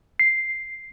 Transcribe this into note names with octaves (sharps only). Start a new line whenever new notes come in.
C7